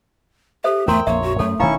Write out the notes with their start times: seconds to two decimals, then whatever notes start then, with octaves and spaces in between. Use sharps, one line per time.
0.64 G4 A4 C5 E5
0.88 E2 G#2 A3 A#4 G5 A#5 C6
1.07 A#1 F2 A#3 C#5 E5
1.23 F#4
1.39 F#2 F#3 A3 C#4 A4
1.59 E1 D#3 C#4 D#4 E4 F5 A#5 C#6